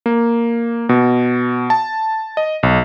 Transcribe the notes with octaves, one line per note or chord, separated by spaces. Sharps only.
A#3
B2
A5
D#5
B1